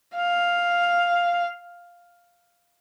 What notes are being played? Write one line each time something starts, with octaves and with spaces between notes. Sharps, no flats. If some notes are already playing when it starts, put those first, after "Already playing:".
F5